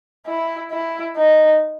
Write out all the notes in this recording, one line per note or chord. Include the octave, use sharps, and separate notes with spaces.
E4
E4
D#4